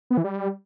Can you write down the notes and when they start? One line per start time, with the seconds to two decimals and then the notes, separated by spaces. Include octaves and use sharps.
0.10 B3
0.17 E3
0.24 G3